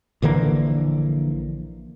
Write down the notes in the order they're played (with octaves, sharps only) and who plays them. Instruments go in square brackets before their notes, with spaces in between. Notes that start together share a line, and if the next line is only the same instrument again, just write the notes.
[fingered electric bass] A#1 D3 E3 A#3